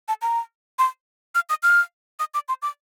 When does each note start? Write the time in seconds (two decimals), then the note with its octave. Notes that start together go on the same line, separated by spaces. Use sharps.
0.08 A5
0.22 A#5
0.79 C6
1.35 F6
1.49 D#6
1.63 F6
2.19 D#6
2.34 D6
2.48 C6
2.62 D6